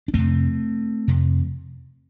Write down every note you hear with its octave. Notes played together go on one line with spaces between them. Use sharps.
D4
F2 C3 A3 C4
F2 C3